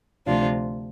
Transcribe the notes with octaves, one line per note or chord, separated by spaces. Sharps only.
D2 C3 F3 D4 F4